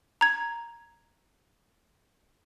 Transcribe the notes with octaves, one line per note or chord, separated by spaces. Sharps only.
A#5 G#6